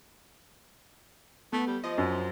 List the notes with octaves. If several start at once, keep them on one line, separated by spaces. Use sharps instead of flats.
A3 B3
G3
F3 D#5
F#2